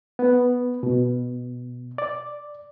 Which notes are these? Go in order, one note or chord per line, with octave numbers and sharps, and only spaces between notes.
B3
B2
D5